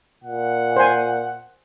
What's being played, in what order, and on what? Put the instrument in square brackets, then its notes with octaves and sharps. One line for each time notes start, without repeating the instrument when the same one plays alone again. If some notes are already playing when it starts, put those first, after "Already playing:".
[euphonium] A#2 [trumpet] F#5
[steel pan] C5 G#5